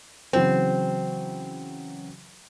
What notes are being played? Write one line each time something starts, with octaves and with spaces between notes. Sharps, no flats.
C#3 E3 F#3 C4